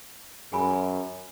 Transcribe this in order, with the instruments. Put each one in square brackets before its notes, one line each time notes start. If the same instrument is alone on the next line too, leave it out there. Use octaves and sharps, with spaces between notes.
[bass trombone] F#2 [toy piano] G#4 G#5 B5